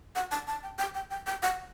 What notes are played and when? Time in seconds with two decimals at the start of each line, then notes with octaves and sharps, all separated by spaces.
0.15 F#5
0.31 A5
0.47 A5
0.63 G5
0.79 G5
0.94 G5
1.11 G5
1.26 G5
1.43 F#5